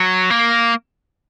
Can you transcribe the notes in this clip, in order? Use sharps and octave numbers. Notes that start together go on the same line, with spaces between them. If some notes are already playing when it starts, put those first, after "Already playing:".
Already playing: F#3
A#3